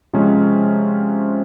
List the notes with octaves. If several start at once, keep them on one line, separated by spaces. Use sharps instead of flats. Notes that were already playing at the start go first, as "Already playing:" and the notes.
C3 F3 G#3 C#4